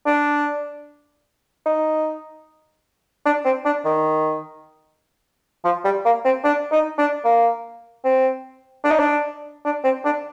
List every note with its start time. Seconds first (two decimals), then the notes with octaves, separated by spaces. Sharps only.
0.06 D4
1.66 D#4
3.26 D4
3.45 C4
3.65 D4
3.85 D#3
5.65 F3
5.85 G3
6.05 A#3
6.25 C4
6.44 D4
6.72 D#4
6.98 D4
7.25 A#3
8.04 C4
8.84 D4
8.92 D#4
8.99 D4
9.65 D4
9.84 C4
10.05 D4